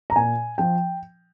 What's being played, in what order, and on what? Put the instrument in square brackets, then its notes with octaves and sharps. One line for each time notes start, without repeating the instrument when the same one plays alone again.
[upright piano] A#5
A#2 G#5
F3 G5